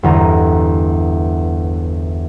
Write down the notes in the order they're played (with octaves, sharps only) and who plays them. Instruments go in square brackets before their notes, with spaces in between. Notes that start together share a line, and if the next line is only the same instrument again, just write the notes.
[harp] G1 E2 A#5 D#6